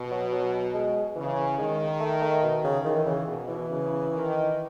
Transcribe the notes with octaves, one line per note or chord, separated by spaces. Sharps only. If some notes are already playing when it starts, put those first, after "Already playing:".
Already playing: B2
F#3
F#3
G#3
C#3 E3
D#3 G#3
A3
A3
B2
C#3
D#3 E3
C#3
B2
E3
C#3
D#3